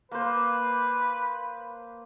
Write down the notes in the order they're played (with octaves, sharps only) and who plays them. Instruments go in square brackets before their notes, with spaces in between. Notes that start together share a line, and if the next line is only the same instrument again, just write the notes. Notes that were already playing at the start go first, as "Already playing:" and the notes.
[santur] A#3 C5 [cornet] B4